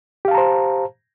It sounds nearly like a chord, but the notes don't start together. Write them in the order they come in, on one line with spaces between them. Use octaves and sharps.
G4 F5 A5 A#5 C5